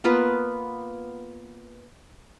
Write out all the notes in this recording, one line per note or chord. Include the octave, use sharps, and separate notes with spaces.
A#3 B3 F4 B4